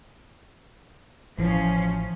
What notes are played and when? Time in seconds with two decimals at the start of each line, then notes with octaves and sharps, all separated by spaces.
1.38 A1 E3 F3 C#4